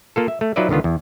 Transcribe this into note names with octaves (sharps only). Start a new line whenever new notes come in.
A#3 F4 A4
E5
A3
F#3 D#4 F4 B4 D5 E5
C#2 D3 D#3 B3 F4
E2